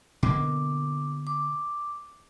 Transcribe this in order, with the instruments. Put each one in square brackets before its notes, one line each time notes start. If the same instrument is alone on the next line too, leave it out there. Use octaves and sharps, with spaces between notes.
[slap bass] B2 D3 A#3 [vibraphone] D6
[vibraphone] D6